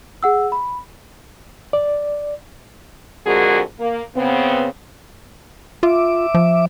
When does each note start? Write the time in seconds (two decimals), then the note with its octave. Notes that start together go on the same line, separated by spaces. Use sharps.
0.23 G#4 F#5 E6
0.52 B5
1.73 D5
3.26 F2 D3 G#3 F#4 G#4 A#4
3.80 A#3
4.16 C#3 B3 C4
5.83 F4 E5 D6
6.34 F3